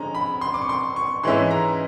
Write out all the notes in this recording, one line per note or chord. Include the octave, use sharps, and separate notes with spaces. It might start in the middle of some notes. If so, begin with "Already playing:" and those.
Already playing: D3 F3 G#3 C#4 A#5
B5
C6
D6
C#6
C6
C#6
G#2 E3 G#3 C#4 E4 C6
A#5